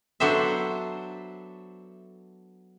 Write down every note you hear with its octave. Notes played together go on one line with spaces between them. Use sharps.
F#3 B3 D4 A4 C5 E5